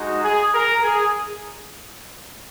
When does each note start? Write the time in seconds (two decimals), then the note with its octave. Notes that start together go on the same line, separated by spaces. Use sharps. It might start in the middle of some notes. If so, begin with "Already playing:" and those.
Already playing: G#3 D#4 F#4
0.23 G#4
0.53 A#4
0.83 G#4